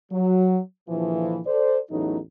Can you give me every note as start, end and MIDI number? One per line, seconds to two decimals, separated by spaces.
0.12 0.59 54
0.89 1.39 34
0.89 1.39 50
0.89 1.39 52
0.89 1.39 53
1.46 1.78 69
1.46 1.78 72
1.46 1.78 74
1.91 2.18 33
1.91 2.18 40
1.91 2.18 52
1.91 2.18 54
1.91 2.18 57
1.91 2.18 63